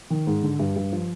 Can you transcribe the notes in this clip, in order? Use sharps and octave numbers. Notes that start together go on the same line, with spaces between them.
D#3
G#2
D3
G2
G2
F3